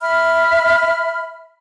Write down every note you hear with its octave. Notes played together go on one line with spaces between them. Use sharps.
E5 B5 F6